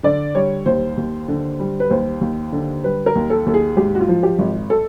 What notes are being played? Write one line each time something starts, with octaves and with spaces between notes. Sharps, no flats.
D3 D5
G3 C#5
D#2 C5
D#2
D3
G3
B4
D#2 C5
D#2
D3
G3 B4
A#4
D#2
A4
D#2 A4
G#4
G#2 G4
F#4
F4
F3
G4
G#1
A4